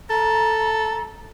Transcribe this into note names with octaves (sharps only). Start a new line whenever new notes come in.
A4 A#5